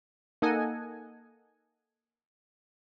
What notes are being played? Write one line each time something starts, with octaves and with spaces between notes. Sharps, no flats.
A#3 D#4 A4 D#5 F#5 G#5